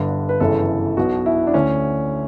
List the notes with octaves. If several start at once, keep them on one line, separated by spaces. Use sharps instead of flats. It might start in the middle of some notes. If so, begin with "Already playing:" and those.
Already playing: G1 G2 D3 D4
B4
G1 F#2 C#3 E3 A4
B1 B2 F#4
E4
D4
D2 D3 C#4